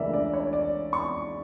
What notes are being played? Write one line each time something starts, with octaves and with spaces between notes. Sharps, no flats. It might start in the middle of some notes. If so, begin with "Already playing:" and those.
Already playing: C#2 C#3 E3 A3 D4 A#4 D5 E5
D5
C#5
D5
C#6